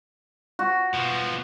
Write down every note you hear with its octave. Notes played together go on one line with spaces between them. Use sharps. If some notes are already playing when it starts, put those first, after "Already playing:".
F#4
B2 F3